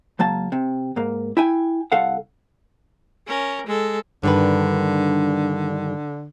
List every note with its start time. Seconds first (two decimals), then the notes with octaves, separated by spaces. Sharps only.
0.19 C#2 F#3 A#3 A5
0.52 C3
0.96 G#2 A#3
1.37 E4 G5 G#5
1.92 C2 A4 F5 F#5
3.27 C#4 A#4
3.67 G#3 A4
4.23 G2 D3 D#3 B4